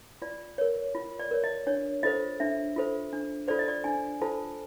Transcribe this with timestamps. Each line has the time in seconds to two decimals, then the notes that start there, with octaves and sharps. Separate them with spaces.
0.22 F4 D5
0.58 A#4 C#5
0.95 F4
1.19 D5
1.31 A#4 C#5
1.44 D#5
1.67 D4 C#5
2.03 F4 A4 C5 D#5
2.40 D4 E5
2.76 F4 A4 C5
3.13 D4
3.48 F4 A4 C5 D5
3.59 D#5
3.68 D5
3.84 D4 G#5
4.21 F4 A4 C5 A5